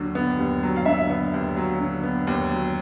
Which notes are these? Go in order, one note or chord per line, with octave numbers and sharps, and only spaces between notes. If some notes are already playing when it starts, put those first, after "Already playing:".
Already playing: D#2 D3 F#3
B3
D#2
F#3
F5
D3 E5
B3
D#2
F#3
D3
B3
D#2
F#3